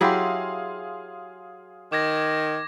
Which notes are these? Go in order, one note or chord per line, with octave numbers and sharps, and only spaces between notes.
F#3 E4 G4 G#4 F5 C6
D#3 D6 G#6 A#6